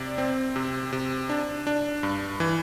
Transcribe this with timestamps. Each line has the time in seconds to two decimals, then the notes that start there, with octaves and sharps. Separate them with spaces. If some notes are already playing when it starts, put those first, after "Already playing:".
Already playing: C3 D5
0.18 C4
0.56 C3
0.93 C3
1.29 D4
1.67 D4
2.03 G2
2.40 E3